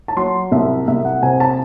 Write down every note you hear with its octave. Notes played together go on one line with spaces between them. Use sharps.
A5
F#3 C6
C2 E5
C2 E5
F#5
C3 G#5
A5